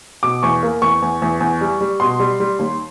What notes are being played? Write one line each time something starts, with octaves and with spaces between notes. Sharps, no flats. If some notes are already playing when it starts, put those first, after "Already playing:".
B2 D6
E2 C#6
A#3
E2 C#6
E2
E2
E2
G3
G3
B2 C6
G3
G3
D#2